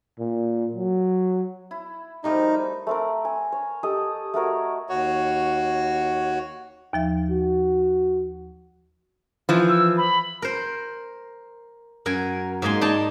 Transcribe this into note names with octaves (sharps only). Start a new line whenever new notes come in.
A#2
F#3
E4
F3 G3 A3 C4 D#4 F4 A#4
A3 C4 A#4
G#5
C#5
G4 A4 D#5
A3 F#4 A#4 C#5
D#2 F#4 C#5
D#2 F3 E5
F#4
E3 F3
E6
B5
A#4 C5
F#2 A#4 G#5
G#2 A#3 D#5 G#5 C6
D#4 D5 A5